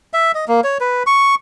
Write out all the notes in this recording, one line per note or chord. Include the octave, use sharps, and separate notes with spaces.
E5
D#5
A#3
C#5
B4
C#6